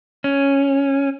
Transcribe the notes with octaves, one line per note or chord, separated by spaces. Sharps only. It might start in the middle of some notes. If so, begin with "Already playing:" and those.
C#4